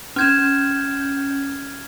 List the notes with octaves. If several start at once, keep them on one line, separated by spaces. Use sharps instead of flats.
C#4 F6 G6 G#6 E7